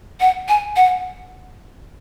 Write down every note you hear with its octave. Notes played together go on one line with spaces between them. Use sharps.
F#5
G#5
F#5